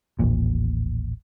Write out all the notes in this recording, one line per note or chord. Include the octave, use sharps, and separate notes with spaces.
D#1 A1 A#2